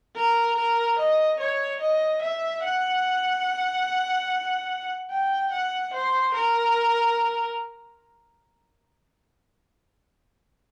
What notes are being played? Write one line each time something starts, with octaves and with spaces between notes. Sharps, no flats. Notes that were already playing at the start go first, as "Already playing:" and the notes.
A#4
A#4
D#5
C#5
D#5
E5
F#5
G5
F#5
C5
A#4